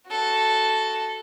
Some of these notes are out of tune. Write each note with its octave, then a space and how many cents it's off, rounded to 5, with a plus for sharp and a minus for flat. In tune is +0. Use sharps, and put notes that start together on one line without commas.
F#4 +0 A4 -5